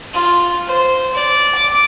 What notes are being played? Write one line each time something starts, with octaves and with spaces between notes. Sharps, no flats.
F4
C5
D5
D6